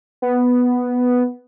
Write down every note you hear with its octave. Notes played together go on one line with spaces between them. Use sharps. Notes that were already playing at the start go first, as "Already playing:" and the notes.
B3